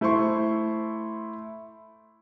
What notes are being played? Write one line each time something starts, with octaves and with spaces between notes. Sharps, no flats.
A3 E4 C5 C6 C#6